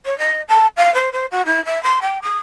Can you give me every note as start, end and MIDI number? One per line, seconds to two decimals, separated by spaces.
0.05 0.16 73
0.18 0.41 75
0.48 0.66 81
0.76 0.93 77
0.94 1.09 72
1.12 1.25 72
1.31 1.42 66
1.45 1.63 64
1.65 1.81 76
1.83 1.99 84
2.01 2.18 79
2.22 2.37 87